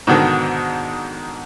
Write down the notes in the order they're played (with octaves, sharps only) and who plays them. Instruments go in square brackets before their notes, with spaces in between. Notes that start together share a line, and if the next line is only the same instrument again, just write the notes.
[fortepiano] G#2 B2 D3 D#3